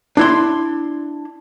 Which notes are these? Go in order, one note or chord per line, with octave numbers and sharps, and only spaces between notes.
D4 E4 C6